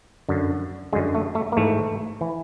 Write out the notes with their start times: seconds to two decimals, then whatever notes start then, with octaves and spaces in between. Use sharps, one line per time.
0.29 F#2 D3
0.93 F#2 D3 G#3
1.15 A3
1.35 A3
1.52 A#3
1.57 G#2 E3 A3
2.21 E3